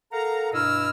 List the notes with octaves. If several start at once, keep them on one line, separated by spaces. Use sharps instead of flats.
A4 A#4 F5 F#5 A#5
G2 B2 E4 D#5 E6 F6